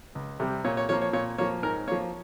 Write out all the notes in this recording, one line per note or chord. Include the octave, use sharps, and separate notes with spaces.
C#2
C3 G3
A#2 C#5
C#5
F3 A#3 C#5
C#5
A#2 C#5
F3 A#3 C#5
G#2 A#4
F3 A#3 C#5